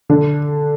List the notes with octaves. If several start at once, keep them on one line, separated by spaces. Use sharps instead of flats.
D3 D4